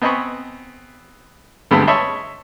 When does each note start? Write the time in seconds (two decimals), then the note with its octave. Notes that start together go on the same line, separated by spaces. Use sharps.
0.02 B3 C4 D#5 G#5 B5 C#6
1.71 D2 G2 G#3 B3 B5 E6
1.87 C#5 D#5 E5 A5 B5 C6